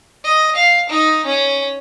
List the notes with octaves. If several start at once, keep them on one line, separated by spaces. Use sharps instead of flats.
D#5
F5
D#4
C#4